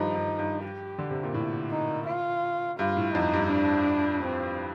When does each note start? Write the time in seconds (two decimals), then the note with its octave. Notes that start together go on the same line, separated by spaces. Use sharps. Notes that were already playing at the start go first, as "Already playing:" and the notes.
Already playing: G2 D#3 F3 D#4
0.15 G2
0.39 G2
0.63 G4
0.99 D3
1.11 C3
1.23 A#2
1.34 A2
1.71 D#4
2.06 F4
2.79 G2 F4
2.97 A2
3.14 F2 D#4
3.33 G2
3.50 D4
4.23 C4